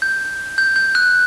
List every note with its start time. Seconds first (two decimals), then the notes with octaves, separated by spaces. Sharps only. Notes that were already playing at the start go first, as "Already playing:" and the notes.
0.02 G6
0.58 G6
0.76 G6
0.95 F#6